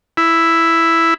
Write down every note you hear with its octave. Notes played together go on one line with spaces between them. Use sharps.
E4